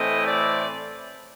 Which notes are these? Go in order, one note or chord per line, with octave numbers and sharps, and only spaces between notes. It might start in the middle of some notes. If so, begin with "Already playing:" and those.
Already playing: A2 E3 A3 C4 E4 D#5
D5